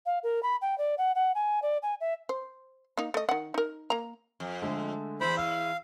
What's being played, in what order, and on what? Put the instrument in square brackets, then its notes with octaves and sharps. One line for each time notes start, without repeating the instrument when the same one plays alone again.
[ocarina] F5
A#4
B5
G5
D5
F#5
F#5
G#5
D5
G#5
E5
[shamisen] C5
A#3 D#4
A3 D#5
D#3 F#5
D#4 A#4
A#3 A#5
[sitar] F2
[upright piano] D3 G#3 A3
[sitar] E2 E4 [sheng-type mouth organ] C5 B5
[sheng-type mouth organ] F5 [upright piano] E6